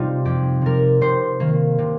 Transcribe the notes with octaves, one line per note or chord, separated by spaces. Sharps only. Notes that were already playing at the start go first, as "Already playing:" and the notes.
Already playing: C3 G3 D#4 F4 G4
F2 G4
C3 G3 A#4
C3 C5
D#3 A#3
C3